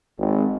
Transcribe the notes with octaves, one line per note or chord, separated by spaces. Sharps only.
G#1